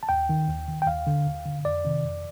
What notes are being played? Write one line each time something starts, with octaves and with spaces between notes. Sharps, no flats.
A5
D#2 G5
D#3
D#2
D#3
G5
D#2 F5
D3
D#2
D3
F2 D5
C3 D#3
F2